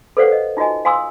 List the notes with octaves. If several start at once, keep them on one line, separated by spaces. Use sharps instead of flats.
A4 B4 C5 D5 F5 F#5
D#5
D#4 F4 F#4 D#5 G#5
F5 G#5 C6 D#6 E6